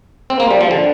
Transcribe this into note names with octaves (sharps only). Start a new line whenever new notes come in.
C4
A#3
G3
F3
D3